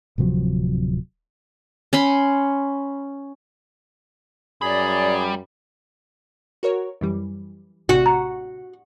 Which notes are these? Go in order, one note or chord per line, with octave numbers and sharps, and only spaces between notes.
D1 C3 F3 F#3
C#4 B5 C6
F#2 G3 G#4 D5 B5
F#4 A#4 C#5
F#2 E3 G3
A1 C3 F#4
A#5